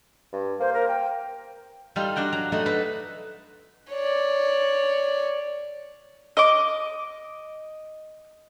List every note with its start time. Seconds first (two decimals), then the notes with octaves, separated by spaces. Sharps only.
0.33 G2
0.60 A#3 C5
0.73 A#4
0.88 G5
1.96 G3 D#4 F4 A4
2.16 D4 F#4 G5 A#5
2.32 F#3 A#5
2.52 A3 D#4 F#4 D#5 F#5
2.66 F#4 A4 B4
3.92 C#5 D5
6.37 D#5 D6